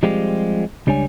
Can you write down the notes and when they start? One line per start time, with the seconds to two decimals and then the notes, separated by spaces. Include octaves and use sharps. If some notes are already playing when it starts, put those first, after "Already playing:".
0.03 F3 G3 G#3 C4 F4 G4
0.87 C#2 G3 D4 C#5 G#5